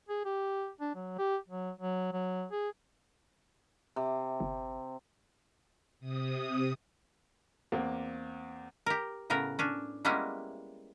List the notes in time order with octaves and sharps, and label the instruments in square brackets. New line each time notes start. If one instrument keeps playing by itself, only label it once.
[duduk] G#4
G4
D4
F#3
G4
F#3
F#3
F#3
G#4
[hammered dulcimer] C3
[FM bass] G1
[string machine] C3 D#6
[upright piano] E2 A#3 C4
[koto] G4 A#4
A2 C#3 B3 A#4
C#4 D4
G3 G#3 A#3 B3 C#4 E4